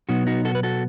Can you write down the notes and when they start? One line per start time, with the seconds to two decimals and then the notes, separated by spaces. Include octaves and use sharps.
0.09 B2 F#3 B3 D#4 F#4
0.27 D#4 F#4
0.45 F#4 A4
0.55 B4
0.63 F#4 A4